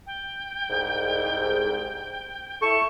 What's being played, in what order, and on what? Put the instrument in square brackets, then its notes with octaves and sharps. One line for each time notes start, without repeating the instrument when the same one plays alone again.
[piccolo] G5
[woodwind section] C2 G#2
[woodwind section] E4 A4 [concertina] C#6 [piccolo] E7